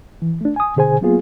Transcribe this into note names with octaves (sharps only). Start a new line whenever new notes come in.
E3
A3 D4
G#5 D#6
B2 D3 G#4 C5 G#5
F#3 A#3 B3 F4 G#4